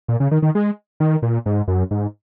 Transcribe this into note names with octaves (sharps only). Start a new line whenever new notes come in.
A#2
C#3
D#3
D#3
G#3
D#3
A#2
G#2
F#2
G#2